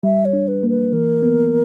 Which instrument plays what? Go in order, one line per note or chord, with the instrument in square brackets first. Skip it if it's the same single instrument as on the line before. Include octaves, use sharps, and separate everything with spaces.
[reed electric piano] G3 [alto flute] E5
[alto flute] C#5
[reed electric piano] D4
[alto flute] B4
[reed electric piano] A#3
[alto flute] B4
[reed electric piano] E3 [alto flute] A#4
[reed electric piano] B3